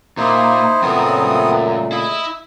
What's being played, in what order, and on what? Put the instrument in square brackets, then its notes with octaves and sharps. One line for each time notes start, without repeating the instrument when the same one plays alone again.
[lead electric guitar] A#2 [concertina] D#4 E4 C5
[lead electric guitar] F#2 [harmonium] A#2 C#3 A3 [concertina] B3 C4 D#6
[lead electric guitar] E4 [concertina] D#5